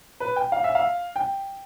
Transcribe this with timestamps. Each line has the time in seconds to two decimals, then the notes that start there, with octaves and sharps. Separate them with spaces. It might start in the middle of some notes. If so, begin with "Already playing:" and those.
0.20 B4
0.36 G5
0.52 F5
0.64 E5
0.75 F5
1.16 G5